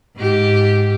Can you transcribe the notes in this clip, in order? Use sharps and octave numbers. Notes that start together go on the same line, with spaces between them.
G#2 G4